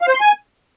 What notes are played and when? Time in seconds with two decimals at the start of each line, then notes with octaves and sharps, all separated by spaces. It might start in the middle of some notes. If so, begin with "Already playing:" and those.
0.01 F5
0.08 C5
0.14 C6
0.20 G#5